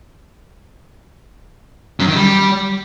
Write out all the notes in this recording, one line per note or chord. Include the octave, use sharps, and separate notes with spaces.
F#2
D#3
G3